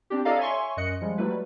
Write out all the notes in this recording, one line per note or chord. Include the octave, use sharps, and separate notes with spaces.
C4 D4 G4
E4 A4 D5 D#5 F5 A#5
C#5 E5 G#5 C6 C#6
F#2 D#5 F#6 C#7
F3 G3 G#3
F#3 G3 A3 E4 B4